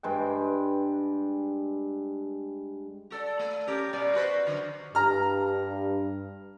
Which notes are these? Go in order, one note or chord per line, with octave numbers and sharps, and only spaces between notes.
G2 G#3 G5
F#4 A4 D5
A3
C#4 G4 A#4
B2 G3 D5
F#4 B4 C5
D3 F#3
G2 A#5 F6